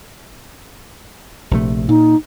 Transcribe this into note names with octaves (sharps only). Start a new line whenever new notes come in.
A#1 C3 A3
A#2 D#4